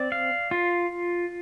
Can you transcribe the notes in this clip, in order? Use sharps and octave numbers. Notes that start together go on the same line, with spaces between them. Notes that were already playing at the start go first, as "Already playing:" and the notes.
Already playing: C4 D5
F5
F4